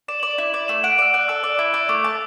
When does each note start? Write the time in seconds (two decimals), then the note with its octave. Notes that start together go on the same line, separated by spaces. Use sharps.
0.08 D5 E7
0.20 D5 F#7
0.31 E7
0.38 E4
0.54 D5
0.68 A3 E7
0.84 F#5 D7
0.98 D5 E6
1.14 D5 F#6
1.28 A4 E6
1.44 D5
1.59 E4
1.74 D5
1.89 A3 D6
2.04 A5